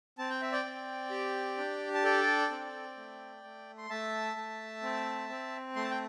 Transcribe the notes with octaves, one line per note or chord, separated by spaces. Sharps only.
C4 A5
G5
E5
D5 G5
C4
G4
D4
A5
A4 D5 G5
C4
A3
A3
C6
A3 E5 A5
A3
C4
C4
A3 C6
A5
G5